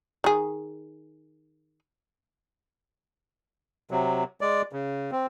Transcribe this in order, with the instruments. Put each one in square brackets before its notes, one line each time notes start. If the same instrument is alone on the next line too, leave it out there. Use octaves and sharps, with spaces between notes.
[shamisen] D#3 G#4
[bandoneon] C3 F#3
G#3 D5
C#3
C4